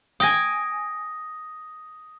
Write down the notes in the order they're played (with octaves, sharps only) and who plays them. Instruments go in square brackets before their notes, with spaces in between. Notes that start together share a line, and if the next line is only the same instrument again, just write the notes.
[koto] G5 G#5 [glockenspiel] D#6 A#6